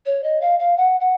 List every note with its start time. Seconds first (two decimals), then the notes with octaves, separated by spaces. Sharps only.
0.06 C#5
0.24 D#5
0.41 F5
0.59 F5
0.77 F#5
1.00 F#5